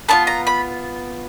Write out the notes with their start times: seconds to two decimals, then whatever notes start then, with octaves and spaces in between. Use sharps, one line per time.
0.09 B3 D4 F4 A5
0.27 A#5
0.47 B5